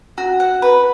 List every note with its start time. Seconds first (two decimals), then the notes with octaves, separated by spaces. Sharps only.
0.18 F#4
0.40 F#5
0.62 B4